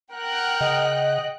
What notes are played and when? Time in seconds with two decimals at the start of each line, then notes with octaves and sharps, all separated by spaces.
0.12 A#4 F#5 G5 F#6
0.61 C#3 D#5